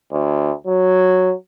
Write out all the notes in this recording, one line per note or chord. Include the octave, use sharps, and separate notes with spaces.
D2
F#3